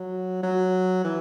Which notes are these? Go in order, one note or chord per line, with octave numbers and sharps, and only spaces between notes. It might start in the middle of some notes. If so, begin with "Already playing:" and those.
Already playing: F#3
F#3
E3